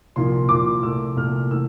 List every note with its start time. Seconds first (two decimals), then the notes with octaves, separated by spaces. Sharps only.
0.16 C2 A#2 F3 C6
0.49 C2 A#2 F3 D6
0.83 C2 A#2 A3 E6
1.17 C2 A#2 A3 F6
1.51 C3 E3 A3 E6